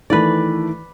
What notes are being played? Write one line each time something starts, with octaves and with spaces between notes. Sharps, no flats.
D#3 E3 A3 B4 D5